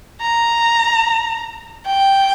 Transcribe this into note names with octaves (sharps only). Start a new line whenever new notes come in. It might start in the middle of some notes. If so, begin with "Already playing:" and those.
A#5
G5